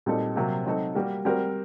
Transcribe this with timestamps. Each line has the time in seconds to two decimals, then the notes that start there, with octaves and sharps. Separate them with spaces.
0.06 A#2 G3 C4 D#4 A4
0.36 C3 F#3 A#3
0.65 F#3 C4 D#4 F#4 A4
0.95 G3 A#3 F#4 A#4
1.25 G3 C4 F#4 A#4